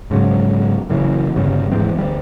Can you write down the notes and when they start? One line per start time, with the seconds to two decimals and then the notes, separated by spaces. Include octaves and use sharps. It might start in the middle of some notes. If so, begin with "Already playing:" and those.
0.11 G#2 C#3 F#3
0.89 F#1 F#2 C#3 E3
1.35 G1 G2 C#3 G3
1.72 D#1 G#2 E3 C4
1.96 D2 G3